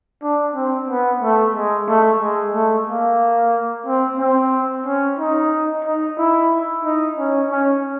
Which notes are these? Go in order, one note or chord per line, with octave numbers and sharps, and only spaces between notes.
D4
C4
B3
A3
G#3
A3
G#3
A3
A#3
C4
C4
C#4
D#4
D#4
E4
D#4
C#4
C#4